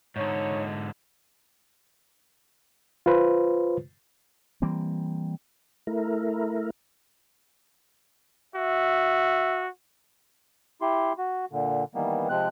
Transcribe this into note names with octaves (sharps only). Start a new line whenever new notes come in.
G#2 D3 D#4 C#5
F4 B4 C5
E3 G3 A#3 C4
A3 E4 A#4
F#4 E5
E4 G4 C6
F#4
A#2 D3
D#3 E3 G3 A#3 B3
C3 F3 G#3 C4 F#6